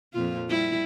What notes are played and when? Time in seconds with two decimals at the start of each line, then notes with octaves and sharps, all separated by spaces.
0.13 F2 A#2 F4
0.49 G3 E4